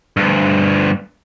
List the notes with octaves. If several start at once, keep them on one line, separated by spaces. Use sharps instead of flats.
D2 G2